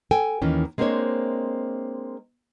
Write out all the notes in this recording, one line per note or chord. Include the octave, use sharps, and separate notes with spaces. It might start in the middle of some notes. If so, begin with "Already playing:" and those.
A4 G5 G#5
D#2 D#3 E3 C#4
G#3 A#3 C4 D4 C5 C#5